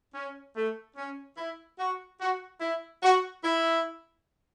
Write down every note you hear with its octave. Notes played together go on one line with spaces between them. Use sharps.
C#4
A3
C#4
E4
F#4
F#4
E4
F#4
E4